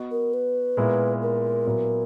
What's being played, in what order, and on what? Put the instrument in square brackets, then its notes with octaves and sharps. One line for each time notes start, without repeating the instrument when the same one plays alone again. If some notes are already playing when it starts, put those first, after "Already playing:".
Already playing: [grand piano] B3 F#4 B4 D#5
[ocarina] A#4
B4
[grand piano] A#2 G#3 B3 E4 A#4
[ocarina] A#4
[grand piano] A#2 F#3 B3 E4